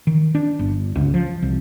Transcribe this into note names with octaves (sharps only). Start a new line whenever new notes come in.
D#3
D4
G1
C#2
F3
C2